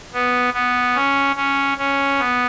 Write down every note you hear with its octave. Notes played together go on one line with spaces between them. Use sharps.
B3
B3
C#4
C#4
C#4
B3